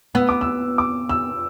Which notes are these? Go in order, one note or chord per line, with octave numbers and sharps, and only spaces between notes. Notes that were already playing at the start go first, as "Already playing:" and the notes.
B3 E6
D6
E6
D6
E6